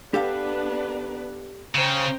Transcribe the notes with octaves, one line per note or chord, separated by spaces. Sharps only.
B3 D4 G4 A4 B4 F5
C#3 C5 G5 A#5